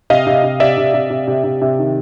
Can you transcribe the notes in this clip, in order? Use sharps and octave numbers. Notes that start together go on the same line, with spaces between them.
C3 D#5 F5
C3
C3
C3 D5 E5
C3
C3
C3
C3
C3
C3
D#3